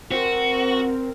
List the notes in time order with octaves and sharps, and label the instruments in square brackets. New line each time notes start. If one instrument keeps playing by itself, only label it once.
[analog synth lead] C4 [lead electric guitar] F#4 [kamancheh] A#4